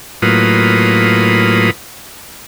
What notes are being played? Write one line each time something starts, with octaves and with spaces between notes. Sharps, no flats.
A2 F#3 A#3 F4 B4 D#6